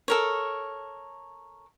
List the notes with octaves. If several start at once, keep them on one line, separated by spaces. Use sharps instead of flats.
A4 A#4 C#5